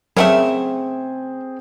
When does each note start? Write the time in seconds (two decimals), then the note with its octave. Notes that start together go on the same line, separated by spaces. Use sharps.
0.17 C#3 F#3 A3 C4 G#4 A#4 E5 F#5